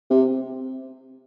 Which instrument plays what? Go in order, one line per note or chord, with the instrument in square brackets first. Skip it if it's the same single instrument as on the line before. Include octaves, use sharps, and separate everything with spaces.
[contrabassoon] C3